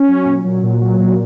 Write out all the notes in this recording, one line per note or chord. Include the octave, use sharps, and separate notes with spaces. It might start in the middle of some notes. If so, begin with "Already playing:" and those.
Already playing: C#4
F#3
A#2
F#3
A#2
F#3
A#2